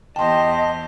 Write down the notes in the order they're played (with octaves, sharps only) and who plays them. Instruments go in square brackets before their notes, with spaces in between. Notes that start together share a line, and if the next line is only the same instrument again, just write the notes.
[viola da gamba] E2 G4 C5 [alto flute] D#5 [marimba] G5 C6 [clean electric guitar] A5